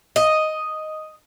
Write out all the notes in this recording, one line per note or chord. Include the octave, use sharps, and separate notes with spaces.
D#5